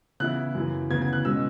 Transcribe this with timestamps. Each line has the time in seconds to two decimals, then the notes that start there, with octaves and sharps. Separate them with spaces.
0.20 C#3 E3 B3 E4 F#6
0.55 F#2 C#3 E3
0.90 D2 C#3 E3 B3 G#6
1.02 G#6
1.13 F#6
1.24 B2 G#3 C#4 E6